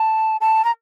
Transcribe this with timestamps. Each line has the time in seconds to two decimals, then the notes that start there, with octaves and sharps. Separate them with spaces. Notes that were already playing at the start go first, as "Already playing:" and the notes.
Already playing: A5
0.41 A5
0.65 A#5